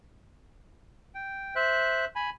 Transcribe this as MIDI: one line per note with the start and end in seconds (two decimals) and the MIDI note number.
1.15 1.54 79
1.56 2.05 72
1.56 2.05 76
1.56 2.05 90
2.16 2.30 80
2.16 2.30 83